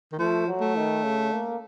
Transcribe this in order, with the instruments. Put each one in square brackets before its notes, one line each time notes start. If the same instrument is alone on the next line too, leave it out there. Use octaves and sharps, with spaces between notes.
[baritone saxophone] D#3
[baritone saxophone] F3 [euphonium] A3
[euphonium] F#3
[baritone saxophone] A3
[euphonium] D#3
C#3
A#3